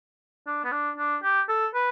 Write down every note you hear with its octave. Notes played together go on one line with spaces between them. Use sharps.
D4
B3
D4
D4
G4
A4
B4